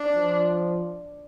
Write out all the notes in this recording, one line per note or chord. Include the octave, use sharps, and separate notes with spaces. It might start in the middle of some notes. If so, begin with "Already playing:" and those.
Already playing: D4
F3